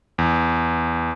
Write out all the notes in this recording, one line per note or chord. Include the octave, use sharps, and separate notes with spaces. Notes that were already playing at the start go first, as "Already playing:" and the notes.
E2